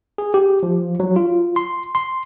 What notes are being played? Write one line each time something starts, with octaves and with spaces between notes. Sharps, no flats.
G#4
G4
F3
F#3
F4
C6
C6